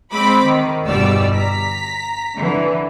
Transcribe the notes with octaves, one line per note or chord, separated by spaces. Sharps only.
G#3 C4 B5 D6
D#3
G1 E2 B2 G3 D5 E6
A#5 B6
D3 E3